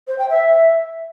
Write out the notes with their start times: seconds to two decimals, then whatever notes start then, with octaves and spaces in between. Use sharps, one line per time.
0.07 C5
0.18 G5
0.29 E5